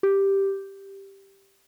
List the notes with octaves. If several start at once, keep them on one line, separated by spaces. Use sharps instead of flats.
G4